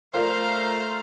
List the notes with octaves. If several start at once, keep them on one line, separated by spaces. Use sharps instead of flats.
A3 F4 A#4 C5 D5 F5 A#5